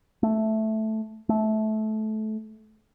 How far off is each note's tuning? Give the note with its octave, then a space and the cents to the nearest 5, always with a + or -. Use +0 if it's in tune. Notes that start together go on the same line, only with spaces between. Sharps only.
A3 -5
A3 -20